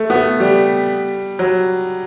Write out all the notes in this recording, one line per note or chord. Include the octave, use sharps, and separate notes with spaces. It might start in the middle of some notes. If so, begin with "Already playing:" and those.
Already playing: A3
B3
A3
G3
F#3